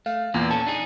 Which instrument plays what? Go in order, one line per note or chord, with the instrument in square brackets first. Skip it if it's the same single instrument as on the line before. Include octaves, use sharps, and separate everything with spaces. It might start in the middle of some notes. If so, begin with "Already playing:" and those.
[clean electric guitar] A3 [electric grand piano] F5
[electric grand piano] E2 A#2 [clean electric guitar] A#3
[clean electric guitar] A#2 C#4 A4 [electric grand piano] A5
[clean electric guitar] D4 D#4 G#4